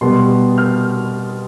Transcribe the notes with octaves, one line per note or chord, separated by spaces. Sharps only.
B2 G3 B3 C6
F6